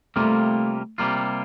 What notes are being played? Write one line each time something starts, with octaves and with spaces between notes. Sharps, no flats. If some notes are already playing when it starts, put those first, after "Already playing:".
C3 G3 A3 A#3 F4
C3 G3 A#3 F4